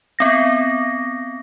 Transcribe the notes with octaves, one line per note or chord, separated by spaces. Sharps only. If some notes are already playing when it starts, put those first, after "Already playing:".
B3 C4 A#6